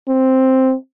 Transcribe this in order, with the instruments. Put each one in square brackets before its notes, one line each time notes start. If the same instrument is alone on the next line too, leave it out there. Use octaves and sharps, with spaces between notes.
[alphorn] C4